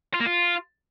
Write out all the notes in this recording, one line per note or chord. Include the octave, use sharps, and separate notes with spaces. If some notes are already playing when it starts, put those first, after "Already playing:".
F4
A#3
F4